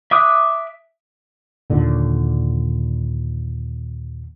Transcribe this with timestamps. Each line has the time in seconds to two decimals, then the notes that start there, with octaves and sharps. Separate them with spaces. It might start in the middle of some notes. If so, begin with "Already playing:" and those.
0.11 E5 D6 D#6 F#6
1.70 D#2 A#2 D3